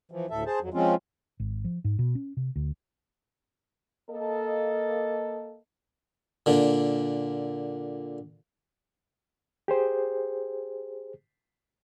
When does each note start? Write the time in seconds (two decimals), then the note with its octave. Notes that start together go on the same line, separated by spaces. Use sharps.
0.12 E3 F3
0.30 D2 A2 A4 E5
0.46 G#4 C5 A5
0.61 F2 F#3
0.74 F3 G#3 C4 C#4 F4
1.40 G#1
1.65 F3
1.84 G#2
1.99 B2
2.15 C#4
2.37 C3
2.56 D2
4.10 A#3 A4 D#5
6.46 A#2 D3
9.68 G4 G#4 C5